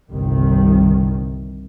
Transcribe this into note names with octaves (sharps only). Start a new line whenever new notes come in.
G1 C2 C3 D#3